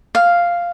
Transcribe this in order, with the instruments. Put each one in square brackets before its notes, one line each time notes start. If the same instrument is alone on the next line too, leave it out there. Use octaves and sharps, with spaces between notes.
[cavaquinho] F5